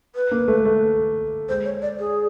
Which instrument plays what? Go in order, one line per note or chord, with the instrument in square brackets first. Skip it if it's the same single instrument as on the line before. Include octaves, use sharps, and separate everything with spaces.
[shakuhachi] B4
[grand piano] A#3
A3
A3
[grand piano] G#3 [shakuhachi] C5
[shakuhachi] C#5
D5
G#4